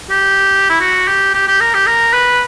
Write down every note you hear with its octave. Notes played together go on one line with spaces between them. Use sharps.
G4
E4
F#4
G4
G4
G4
A#4
G4
A#4
B4